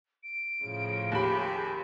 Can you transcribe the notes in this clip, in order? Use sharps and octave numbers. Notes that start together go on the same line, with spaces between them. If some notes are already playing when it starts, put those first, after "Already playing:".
D7
A2 C#3 F3
D#2 G4 G#4 B5